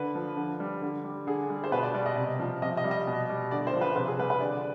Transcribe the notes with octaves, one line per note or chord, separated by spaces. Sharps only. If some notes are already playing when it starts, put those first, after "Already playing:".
Already playing: D3 B4
F3
D3
G3
D3
G3
D3 G#4
G3
C5
B2 B4
D5
G3 D5
D#5
C3
F3
C3 D#5
D#5
G3
D#5
B2
G3
D3 D5
C5
F3
B4
C3 B4
G#4
G3 B4
B4
D3 D5